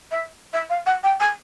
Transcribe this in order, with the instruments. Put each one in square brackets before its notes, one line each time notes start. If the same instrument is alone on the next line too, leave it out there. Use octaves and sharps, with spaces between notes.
[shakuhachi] E5
E5
F5
F#5
G5
G#5